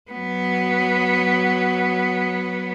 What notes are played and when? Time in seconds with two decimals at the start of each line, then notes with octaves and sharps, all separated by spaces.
0.11 F#3 B3